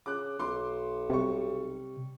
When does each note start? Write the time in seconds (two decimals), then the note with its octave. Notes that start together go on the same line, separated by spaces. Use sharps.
0.06 C#3 D6 F#6
0.39 B1 C6 D6
1.10 C3 G3 C#6